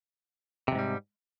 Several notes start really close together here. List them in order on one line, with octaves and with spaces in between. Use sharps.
C3 F2 G#2 G3